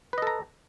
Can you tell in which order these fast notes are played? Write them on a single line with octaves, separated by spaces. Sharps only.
B4 D#5 A4 A#5